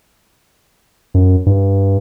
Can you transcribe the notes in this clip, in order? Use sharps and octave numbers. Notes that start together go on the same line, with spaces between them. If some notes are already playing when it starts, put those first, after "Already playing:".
F#2
G2